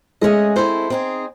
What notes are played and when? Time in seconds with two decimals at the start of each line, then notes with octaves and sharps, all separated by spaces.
0.21 G#3 A3 C#4 G#4 D#5
0.56 G#3 C4 E4 A4 C5
0.90 C4 D#4 G#4